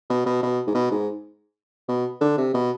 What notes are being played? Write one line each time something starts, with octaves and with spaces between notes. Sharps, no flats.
B2
B2
B2
G#2
B2
G#2
B2
D3
C3
B2